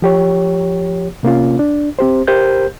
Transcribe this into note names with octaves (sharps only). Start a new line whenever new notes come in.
F3 G4 C#5
C3 A#3 C#4 F4
D4
C4 G4 C5
G4 A#4 C5 G6